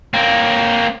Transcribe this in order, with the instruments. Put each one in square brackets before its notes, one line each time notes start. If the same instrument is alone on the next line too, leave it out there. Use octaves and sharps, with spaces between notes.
[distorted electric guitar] A#3 C4